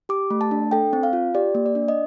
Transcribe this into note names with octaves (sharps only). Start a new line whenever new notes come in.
G4 D6
A3
A5
D4
A4 G5
C4
F5
F4
G4 D5
A#3
D5
D4
D#5